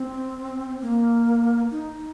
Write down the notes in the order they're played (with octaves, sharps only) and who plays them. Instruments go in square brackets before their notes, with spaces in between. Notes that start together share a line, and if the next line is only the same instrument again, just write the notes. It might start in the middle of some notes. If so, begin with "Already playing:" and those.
Already playing: [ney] C4
A#3
D#4